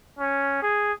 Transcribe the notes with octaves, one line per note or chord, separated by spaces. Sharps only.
C#4
G#4